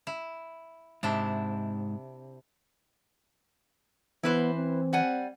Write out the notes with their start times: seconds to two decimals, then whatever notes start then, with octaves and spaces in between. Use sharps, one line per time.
0.07 E4
1.03 G#2 C3 D4 E4
4.23 E3 B3 E4 B4 C5
4.54 C4
4.93 G3 F#5 G#5